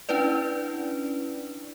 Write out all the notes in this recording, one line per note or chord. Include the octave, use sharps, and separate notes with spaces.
C#4 D4 E4 B4 D5